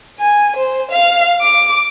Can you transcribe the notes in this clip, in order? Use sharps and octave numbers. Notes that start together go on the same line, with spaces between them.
G#5
C5
F5
D6